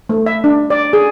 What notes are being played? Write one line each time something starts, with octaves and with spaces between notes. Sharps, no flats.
A3
E5
D4
D5
G#4